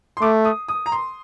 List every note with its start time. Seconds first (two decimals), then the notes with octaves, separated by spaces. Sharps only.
0.17 C6
0.22 A3 D6
0.45 D#6
0.68 D#6
0.86 A#5
0.92 C6